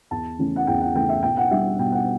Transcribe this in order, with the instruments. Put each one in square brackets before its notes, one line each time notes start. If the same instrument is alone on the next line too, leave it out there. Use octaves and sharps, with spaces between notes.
[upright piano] E2 A5
C#3 E3 A3 C#4
F#5
E2 G5
F#5
C#3 E3 A3 C#4 G5
E5
B2 G5
F#5
G3 D4 E5
B2 G5
F#5